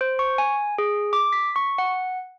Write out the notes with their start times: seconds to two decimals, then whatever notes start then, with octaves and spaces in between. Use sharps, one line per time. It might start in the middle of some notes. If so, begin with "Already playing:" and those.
0.01 C5
0.19 C#6
0.38 G#5
0.78 G#4
1.13 D6
1.33 B6
1.56 C#6
1.78 F#5